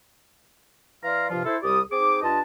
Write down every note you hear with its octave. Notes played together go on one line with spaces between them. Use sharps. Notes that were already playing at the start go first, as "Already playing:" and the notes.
E3 D5 F5 A#5 C6 F6
G2 C3 F3 F4
E4 A4 C5
C2 G3 G4 D5 D#6
C4 D#4 G#4 D6
G2 D4 F4 D#5 A5